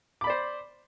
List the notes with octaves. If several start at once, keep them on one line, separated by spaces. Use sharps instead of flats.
C5 D5 B5 D6